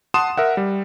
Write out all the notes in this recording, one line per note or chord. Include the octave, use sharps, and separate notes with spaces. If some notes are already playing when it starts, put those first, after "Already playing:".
F#5 A5 C6 D#6 E7
A#4 E5 F#5
G3